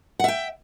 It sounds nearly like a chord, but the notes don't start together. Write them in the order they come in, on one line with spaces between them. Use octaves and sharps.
F#5 E5 G5